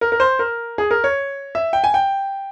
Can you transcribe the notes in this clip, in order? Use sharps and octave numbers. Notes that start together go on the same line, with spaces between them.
A#4
A#4
C5
A#4
G#4
A#4
C#5
E5
G5
G#5
G5